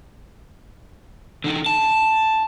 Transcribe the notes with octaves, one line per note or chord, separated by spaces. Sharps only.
D3 D#4
A5